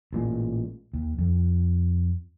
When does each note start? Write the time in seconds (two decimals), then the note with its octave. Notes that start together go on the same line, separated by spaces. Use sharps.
0.13 A1 A#2 G#3
0.94 D#2
1.18 F2